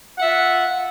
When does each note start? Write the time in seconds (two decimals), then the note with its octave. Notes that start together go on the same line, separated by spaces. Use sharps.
0.18 F#5
0.21 E5
0.23 F4